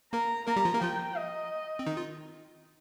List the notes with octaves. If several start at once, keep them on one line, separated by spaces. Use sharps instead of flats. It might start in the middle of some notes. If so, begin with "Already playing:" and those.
A#3 A#4 A#5
A#3 A#4 A#5
G3 G4
F3 F4
A#3 A#4
F3 F4 G5
D#5
C4
D#3 D#4
F4